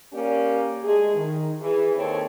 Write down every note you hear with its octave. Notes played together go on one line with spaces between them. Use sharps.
A#3 C#4 G4 D5
G#3 A3 G#4
D#3
E3 G#4
D#2 C4 A4 C#5